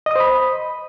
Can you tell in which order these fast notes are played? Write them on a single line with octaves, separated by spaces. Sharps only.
D#5 D#6 C5 B5